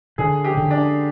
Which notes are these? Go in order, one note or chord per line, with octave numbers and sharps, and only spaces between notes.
D3 G#4
G4
D3
D4